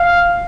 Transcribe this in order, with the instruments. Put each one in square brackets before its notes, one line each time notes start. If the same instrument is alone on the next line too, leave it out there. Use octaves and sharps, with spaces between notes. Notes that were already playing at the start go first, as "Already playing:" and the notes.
Already playing: [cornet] F5